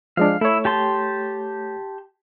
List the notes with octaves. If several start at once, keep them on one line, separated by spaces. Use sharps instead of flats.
F3 G#3 D4 F5
A3 E4 C#5
G4 A5 C6